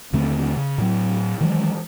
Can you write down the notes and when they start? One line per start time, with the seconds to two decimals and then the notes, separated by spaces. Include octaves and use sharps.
0.13 D#2 D3 A3 C4
0.57 C#3
0.78 A2 F#3
1.41 D#3 E3 F#3 G#3